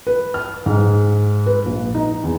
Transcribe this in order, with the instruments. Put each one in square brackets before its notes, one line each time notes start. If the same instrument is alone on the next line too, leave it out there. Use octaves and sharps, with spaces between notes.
[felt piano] B4
F6
G#2
B4
A#1
D#4
E2